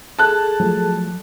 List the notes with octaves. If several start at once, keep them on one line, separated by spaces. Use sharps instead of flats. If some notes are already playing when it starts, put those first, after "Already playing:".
G#4 A4 A5 F#6
F3 F#3 A3